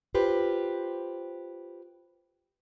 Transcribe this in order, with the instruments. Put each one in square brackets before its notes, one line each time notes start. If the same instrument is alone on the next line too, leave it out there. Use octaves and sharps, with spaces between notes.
[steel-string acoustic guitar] F4 G4 B4 C5